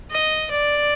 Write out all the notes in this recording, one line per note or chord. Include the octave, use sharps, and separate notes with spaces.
D#5
D5